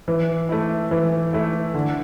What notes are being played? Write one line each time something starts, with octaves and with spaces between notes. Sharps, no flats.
E3
A3 E4
E3
A3 E4
D3